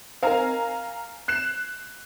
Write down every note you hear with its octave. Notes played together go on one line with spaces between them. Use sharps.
C4 D#4 A#4 F5 G#5 A#5
F#6 C7 E7